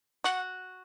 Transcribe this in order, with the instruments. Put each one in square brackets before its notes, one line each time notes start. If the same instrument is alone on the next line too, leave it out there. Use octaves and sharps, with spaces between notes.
[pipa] F#4 [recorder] F#5